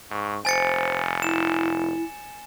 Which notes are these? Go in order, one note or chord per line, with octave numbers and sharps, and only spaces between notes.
G#2 C#6
F1 C5 G#5 A6 C#7
E4 E7